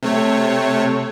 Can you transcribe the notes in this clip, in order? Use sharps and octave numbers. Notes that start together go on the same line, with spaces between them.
C3 A3 C#5